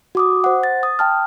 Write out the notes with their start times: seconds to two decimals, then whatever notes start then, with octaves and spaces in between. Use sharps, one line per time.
0.15 F#4 D6 D#6
0.44 C5 F#5
0.63 A6
0.83 D#6
0.99 G5 A5 F6